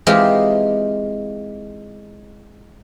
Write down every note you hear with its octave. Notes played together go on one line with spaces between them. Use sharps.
E3 G#3 C4 D#4 F4 G4